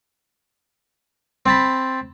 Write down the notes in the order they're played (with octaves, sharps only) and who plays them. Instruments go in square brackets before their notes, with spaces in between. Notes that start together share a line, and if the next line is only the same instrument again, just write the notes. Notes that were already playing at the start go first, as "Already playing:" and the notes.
[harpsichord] C4 A5 B5